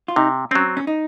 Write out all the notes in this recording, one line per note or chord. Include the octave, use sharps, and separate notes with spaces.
F4
C3 D#4
F#3 C4 C#4
C#4
D#4